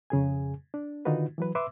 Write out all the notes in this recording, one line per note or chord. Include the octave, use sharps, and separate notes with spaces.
F2 C#3 G#4 G#5
D4
D3 D#3 D#4 F4 F#4 B4
E3 F#3 B4
B4 E5 C6 D6 E6